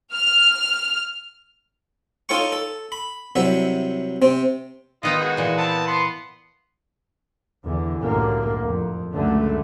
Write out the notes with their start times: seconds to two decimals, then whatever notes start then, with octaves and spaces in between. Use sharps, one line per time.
0.13 F6
2.29 D#4 F4 A4 C#5 G5 C#6
2.52 A4
2.92 B5
3.36 C2 C3 F#3 E5
4.22 C3 C4
5.03 D#3 B3 D#4 F4 D#5
5.20 G#3 F#4
5.37 A#2 E3
5.58 B3 C4 A5
5.87 B3 C6
7.63 E2 D3 E3
8.01 C2 F#2 A2 D3 A#3
8.61 F2
9.15 C#2 F#2 D3 A3